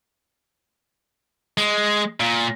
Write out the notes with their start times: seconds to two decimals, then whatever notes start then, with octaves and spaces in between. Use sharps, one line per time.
1.58 G#3
2.20 A#2